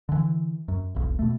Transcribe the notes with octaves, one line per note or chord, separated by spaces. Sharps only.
D3 E3
F#2
E1 B1
B2 A3